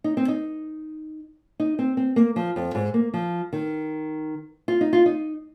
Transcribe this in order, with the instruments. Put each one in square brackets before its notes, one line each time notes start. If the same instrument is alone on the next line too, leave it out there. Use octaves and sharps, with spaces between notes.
[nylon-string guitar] D#4
C4
D#4
D#4
C4
C4
A#3
F3
F2
G#2
A#3
F3
D#3
F4
D#4
F4
D#4